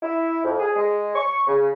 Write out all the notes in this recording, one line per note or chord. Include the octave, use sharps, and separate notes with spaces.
E4
F2
G#4
G#3
C#6
C#3